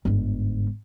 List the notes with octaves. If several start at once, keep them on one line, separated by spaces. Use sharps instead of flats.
G1 G#2